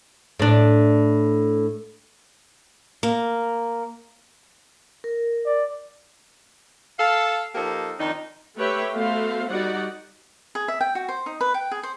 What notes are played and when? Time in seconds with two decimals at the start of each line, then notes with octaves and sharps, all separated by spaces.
0.39 A2 D4
3.03 A#3
5.04 A#4
5.46 D5
6.99 A4 F5
7.55 F3 A#3 D#4 G4 A4
7.99 F2 D#3 D4 D#4
8.56 A3 G4 B4 C#5 E5 G5
8.94 A3 B3 F#4 A4 C5 F5
9.48 G3 D#4 F#4 D5 F#5
10.55 G#4
10.68 E5
10.81 G5
10.95 F#4
11.09 C5
11.26 D#4
11.41 B4
11.54 G5
11.72 G#4
11.83 C5